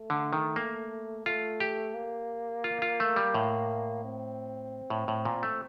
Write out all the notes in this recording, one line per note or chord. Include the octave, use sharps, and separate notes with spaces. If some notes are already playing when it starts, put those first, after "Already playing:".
Already playing: A3
D3
D#3
A#3
A3 F4
G4
A#3
F4
F4
A3
G3
A2
C4
A2
A2
A#2
A3